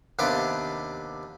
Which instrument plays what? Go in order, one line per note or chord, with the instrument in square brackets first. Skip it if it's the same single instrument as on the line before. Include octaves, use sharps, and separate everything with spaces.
[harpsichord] D#2 C3 B3 D4 D6